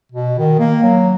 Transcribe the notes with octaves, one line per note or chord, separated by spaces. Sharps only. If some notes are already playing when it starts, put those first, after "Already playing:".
B2
D#3
A#3
F#3